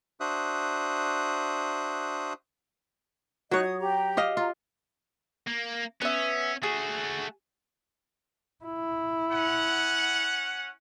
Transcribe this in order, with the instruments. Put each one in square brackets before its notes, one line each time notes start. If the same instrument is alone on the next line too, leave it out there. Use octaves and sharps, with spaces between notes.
[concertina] D4 F#4 C5 E5 D#6 F#6
[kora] F#3 C#5 [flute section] D#4 D#5 F#6
[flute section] D#6
G4 A#5
[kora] G4 D#5 F5
[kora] F4 [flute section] A#5
[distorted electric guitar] A#3
[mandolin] B3 E5 [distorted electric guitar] C#4
[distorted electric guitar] A3 F#4 [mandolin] G#4
[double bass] E4
[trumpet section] C#4 F#5